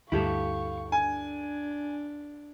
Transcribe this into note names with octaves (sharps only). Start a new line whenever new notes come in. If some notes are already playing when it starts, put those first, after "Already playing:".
D2 G2 E4 G4 A4 F5 C#6
D4 G#5